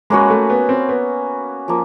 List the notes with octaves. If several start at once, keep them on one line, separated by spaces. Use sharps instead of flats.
G#3 A#3 C#4 F#4 B4
A3
B3
C4
B3
F3 A#3